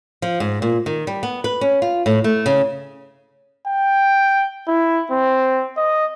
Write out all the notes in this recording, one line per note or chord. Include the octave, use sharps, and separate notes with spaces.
F3
G#2
A#2
D#3
G3
B3
B4
C#4
F4
A2
A3
C#3
G5
E4
C4
D#5